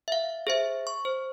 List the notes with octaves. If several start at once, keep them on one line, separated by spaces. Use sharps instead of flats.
E5 F5
G#4 C5 E5
C#6
C5